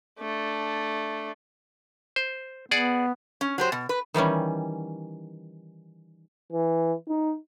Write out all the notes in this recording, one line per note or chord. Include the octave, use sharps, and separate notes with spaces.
A3 D4
C5
B3 G#4 D5 F#5
C#4
F#3 G4 C5
B2
B4
D#3 E3 G3 C#4
E3
D#4